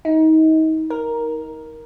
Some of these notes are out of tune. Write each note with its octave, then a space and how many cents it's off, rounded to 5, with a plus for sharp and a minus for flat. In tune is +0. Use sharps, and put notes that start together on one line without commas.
D#4 +30
A#4 +5